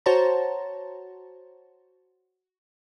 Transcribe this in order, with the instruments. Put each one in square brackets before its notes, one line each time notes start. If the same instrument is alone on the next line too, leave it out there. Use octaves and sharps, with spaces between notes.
[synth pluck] F#4 C5 C#5 A5 A#5